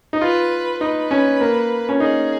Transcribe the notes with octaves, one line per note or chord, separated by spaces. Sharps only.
D#4
F4 B4
D#4 B4
C#4
A#3
C#4
D#4 G#4